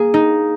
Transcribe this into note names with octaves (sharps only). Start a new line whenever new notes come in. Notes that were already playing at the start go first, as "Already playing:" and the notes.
Already playing: A#3 G#4
D#4